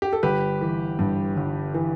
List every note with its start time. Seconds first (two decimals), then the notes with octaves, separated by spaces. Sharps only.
0.02 G4
0.13 A4
0.23 G1 G4 B4
0.61 E3
0.99 G2
1.37 G1
1.74 E3